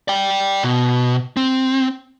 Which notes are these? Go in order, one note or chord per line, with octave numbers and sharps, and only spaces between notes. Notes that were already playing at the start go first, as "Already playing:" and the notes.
D5 G5
B2
C4